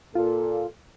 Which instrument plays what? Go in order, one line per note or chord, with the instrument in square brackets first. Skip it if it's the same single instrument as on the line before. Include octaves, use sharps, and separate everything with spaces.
[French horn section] A#2 A4 [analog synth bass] F4